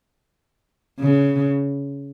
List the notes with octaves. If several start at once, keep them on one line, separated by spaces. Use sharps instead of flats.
C#3